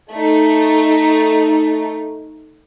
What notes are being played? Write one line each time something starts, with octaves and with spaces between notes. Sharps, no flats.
A3 D#4